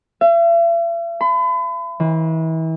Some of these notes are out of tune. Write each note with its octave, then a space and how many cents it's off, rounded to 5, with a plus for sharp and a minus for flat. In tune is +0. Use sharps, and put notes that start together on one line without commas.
E5 +45
B5 +40
E3 -35